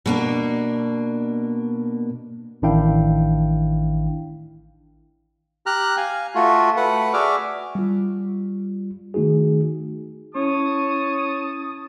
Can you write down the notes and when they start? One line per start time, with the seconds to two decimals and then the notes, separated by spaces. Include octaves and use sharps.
0.06 B2 A#3 D4
2.62 A1 D#3 D4 E4 F5 G5
5.66 G4 A#5 F6 F#6
5.97 F5 G#5
6.35 A3 F4 F#4
6.77 A3 B4 F#5
7.13 F#4 G#4 D5 E5 D6 F6
7.75 G3 F4
9.14 D#3 A3 D#4 F#4 G#4
10.35 C#4 E4 C#5 A5 D#6